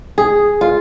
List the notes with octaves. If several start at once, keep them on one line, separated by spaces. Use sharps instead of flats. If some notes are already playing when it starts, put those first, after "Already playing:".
G#4
F4